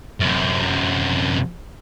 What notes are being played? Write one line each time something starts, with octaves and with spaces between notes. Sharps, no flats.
F#2 C3